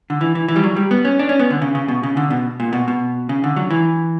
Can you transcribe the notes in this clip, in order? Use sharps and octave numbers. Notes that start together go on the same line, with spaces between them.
D3
E3
E3
E3
G3
F#3
G3
B3
C#4
D4
C#4
B3
D3
C#3
C#3
B2
C#3
D3
B2
A#2
B2
B2
C#3
D3
F#3
E3